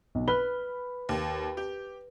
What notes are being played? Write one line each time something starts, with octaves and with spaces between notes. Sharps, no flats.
B1
B4 B5 F6 G7
D#2
G4